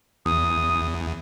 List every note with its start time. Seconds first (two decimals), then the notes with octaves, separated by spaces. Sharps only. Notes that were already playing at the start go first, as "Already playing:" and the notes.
0.26 E2 D#6